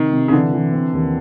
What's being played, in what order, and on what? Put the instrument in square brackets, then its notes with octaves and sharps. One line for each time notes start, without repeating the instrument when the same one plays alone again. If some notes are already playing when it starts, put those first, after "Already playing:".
Already playing: [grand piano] C3 [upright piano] D#3
[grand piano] C3
[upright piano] C#3
[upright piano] D3 [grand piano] E3
[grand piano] E3
C4
D#2